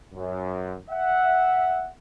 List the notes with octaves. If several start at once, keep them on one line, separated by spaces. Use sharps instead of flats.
F#2
E5 F#5